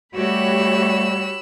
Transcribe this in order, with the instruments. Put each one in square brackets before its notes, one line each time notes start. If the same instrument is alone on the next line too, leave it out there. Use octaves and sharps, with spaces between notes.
[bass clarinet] G3 [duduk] A3 [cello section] F#4 G4 C#5 [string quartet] B5 E6 F#6